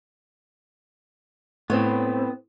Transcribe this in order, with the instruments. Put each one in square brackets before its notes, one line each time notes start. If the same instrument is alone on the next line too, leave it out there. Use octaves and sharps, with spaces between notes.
[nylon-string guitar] A2 C5 C#5 [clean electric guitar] B3 C4